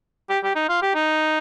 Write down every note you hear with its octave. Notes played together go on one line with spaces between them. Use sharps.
G4
G4
D#4
F4
G4
D#4